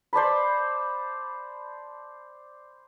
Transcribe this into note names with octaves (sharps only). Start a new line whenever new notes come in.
C5 D5 A5 B5